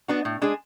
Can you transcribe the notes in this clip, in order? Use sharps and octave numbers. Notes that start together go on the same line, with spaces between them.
B3 D4 F#4
A2
G#3 D4 G#4